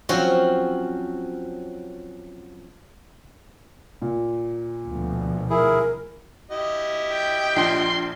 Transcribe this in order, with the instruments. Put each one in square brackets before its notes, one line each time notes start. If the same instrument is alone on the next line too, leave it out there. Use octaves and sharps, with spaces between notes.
[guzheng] F3 F#3 C4 C#4 F#4
[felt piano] A#2
[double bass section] D2 B2 F3
[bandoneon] E4 G#4 [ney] A#4
[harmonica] E4 G4 D#5
[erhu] G5
[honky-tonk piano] A#1 [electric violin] C6